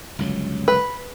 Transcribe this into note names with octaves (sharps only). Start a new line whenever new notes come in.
G1 C#2 F#3
B4